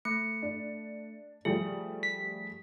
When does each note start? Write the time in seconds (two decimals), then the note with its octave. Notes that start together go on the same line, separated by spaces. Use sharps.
0.05 A3 C#7
0.42 D4
1.45 F3 G3 A3 G#4
2.03 B6